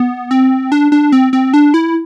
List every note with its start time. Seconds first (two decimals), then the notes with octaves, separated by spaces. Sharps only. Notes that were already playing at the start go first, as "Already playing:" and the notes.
Already playing: B3
0.31 C4
0.72 D4
0.92 D4
1.12 C4
1.33 C4
1.54 D4
1.74 E4